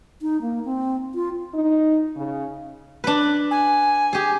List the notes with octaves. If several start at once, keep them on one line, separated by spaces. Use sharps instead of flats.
D#4
A#3
C4
F4
D#4
C#3
D4 B4
G#5
G4 G#4